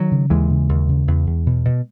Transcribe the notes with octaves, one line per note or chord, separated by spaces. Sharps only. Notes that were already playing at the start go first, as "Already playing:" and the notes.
Already playing: D#3 F#3
C#3
D#2 E3 G#3
C#3
D#2
C#3
E2
E2
B2
B2